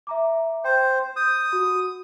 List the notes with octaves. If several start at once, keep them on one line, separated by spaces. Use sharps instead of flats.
E5 A#5 D6
C5 G5
D#6 G6
F#4